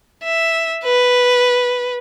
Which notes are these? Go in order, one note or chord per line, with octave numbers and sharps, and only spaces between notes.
E5
B4